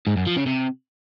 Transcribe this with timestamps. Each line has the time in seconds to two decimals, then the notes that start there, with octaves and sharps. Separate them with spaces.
0.07 G#2
0.17 F#2
0.26 F3
0.36 C#3
0.46 C3